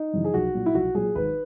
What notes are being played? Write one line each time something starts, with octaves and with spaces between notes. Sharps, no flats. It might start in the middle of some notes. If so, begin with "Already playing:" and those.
Already playing: D#4
F#2 C#3 E3
G#4
B1 F#4
A#2 F#3
E4
B1 F#4
A#2 F#3 G#4
G#1 B4